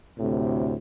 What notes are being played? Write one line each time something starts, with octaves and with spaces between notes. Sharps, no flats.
D2 A2 C3